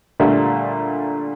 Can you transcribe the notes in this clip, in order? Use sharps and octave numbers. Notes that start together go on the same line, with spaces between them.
A#2 D3 G3 A3